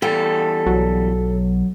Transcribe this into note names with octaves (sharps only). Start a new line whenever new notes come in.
E2 G3 A4 G5
B1 F#3